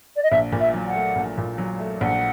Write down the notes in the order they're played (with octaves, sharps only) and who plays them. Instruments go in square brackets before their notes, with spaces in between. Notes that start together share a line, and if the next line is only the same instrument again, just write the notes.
[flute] D5
D#5
[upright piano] A#1 [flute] E5
[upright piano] A#2
[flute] E5
[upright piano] F#3
[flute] F#5
[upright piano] A3
A#1
A#2
F#3
A3
[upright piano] A#1 [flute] F#5